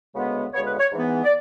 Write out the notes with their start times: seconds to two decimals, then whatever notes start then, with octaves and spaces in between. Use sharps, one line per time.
0.15 D2 C#3 G#3 B3
0.53 D2 C#3 G#3 B3 C#5
0.66 B4
0.79 C#5
0.92 G#2 E3 B3
1.24 D5